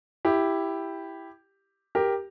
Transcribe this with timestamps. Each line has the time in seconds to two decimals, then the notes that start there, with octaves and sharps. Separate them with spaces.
0.25 E4 G4
1.95 G4 A#4